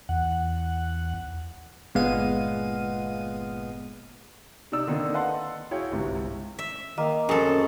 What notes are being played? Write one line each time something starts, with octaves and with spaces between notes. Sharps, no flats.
E2 F#5
G1 A#2 G#3 B3 F5 D#7
C3 D#4 D5 E6
D3 D#3 A#3 C4 D4 D#4
B4 D#5 F5 F#5 A5 C6
E4 F#4 G#4 C#5 F5 G5
G1 C2 G#2 C3
E5
D#3 A#3 D#5 F5
F#2 C4 C#4 G#4 A4